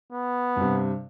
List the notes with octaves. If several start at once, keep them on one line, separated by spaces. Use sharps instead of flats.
B3
G2 C3